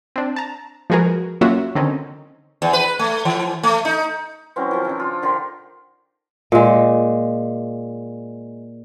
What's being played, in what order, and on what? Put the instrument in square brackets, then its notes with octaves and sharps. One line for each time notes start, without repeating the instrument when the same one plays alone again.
[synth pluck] C4 D4
A5 A#5
F3 G#3 F#4 G#4 A#4 B4
F#3 A#3 C#4 F4 F#4 E5
D3 D#3 C4 C#4 D#4
[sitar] E2
B4
A3
E3
A3
D#4
[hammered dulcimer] E3 F#3 C4 C#4
D#3 F3
C#3 D4
F4
D3 D#3 G4 C6
[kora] A#2 G#3